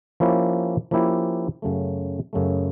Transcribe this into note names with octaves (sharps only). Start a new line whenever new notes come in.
F3 A#3 C#4 E4 G4
F3 A#3 C#4 E4 G4
F#2 C#3 F#3 A3
F#2 C#3 F#3 A3